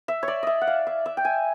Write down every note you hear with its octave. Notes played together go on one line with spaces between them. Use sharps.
E5
C#5
D5
D#5 E5
F#5
F5
E5
E5
G5
G#5